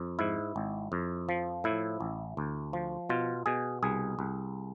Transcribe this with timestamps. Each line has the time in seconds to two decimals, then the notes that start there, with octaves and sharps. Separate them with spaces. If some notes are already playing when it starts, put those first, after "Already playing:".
Already playing: F2
0.19 G#2 E4
0.56 G#1
0.92 F2
1.29 F3
1.64 A2 E4
2.01 A1
2.37 D2
2.73 F3
3.09 B2 F4
3.46 B2 G#4
3.83 C2 G#4
4.19 C2